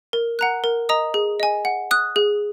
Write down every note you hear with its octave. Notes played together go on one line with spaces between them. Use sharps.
A#4
F#5 A#5 F#6
A#4
D#5 A#5 D#6
G#4
D#5 G#5
F#5
D#6 F#6
G#4